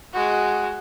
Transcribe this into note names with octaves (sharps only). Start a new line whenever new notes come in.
G#3 F#4